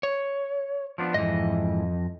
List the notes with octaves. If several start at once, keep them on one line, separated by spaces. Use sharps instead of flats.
C#5
F3 B3 D4
F2 G#2 E3 D#5